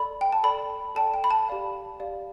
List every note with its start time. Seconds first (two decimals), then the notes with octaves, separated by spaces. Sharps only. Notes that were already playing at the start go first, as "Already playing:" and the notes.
Already playing: A4 D5 B5
0.21 G5
0.32 A5
0.43 A4 D5 G5 B5
0.95 A4 D5 G5 A5
1.14 G5
1.24 B5
1.31 A5
1.48 G4 D5 F5
2.00 G4 D5 F5